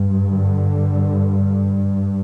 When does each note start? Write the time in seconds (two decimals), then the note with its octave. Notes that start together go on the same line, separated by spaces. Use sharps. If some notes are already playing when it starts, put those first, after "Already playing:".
Already playing: G2
0.27 D3